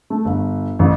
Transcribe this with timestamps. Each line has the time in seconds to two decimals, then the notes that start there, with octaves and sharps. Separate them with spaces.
0.10 A3
0.25 G1
0.79 A1